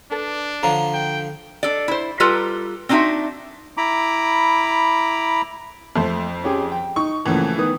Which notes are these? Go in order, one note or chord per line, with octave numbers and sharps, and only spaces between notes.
D4 A4 B4
D3 F3 C#5 F5 A#5
G5
D4 A4 D5
E4 C5
G3 F4 A4 B4 A#5
C4 D4 D#4 F4 F#4 E5
E4 A#5 B5 D6
F2 A3 C5
C#4 G4 G#4
G5
D#4 C#6
A#1 C#3 E3 F3 A3
D#3 B3 D#6